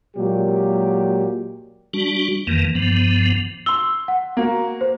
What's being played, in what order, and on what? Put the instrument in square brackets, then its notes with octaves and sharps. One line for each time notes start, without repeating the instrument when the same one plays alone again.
[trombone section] A#2 F#3 G#3 A#3 G4
[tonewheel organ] G3 D4 F#4
F2 D#3 E3 A#3
G2 F3 B3
[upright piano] C6 G7 [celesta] E6
[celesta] F#5
[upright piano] A#3 F#4
[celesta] C5